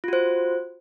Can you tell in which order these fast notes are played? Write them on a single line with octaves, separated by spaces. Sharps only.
F4 F#4 C5